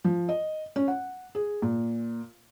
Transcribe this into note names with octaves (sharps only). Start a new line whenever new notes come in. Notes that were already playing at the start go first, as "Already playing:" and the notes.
F3
D#5
C#4
F#5
G#4
A#2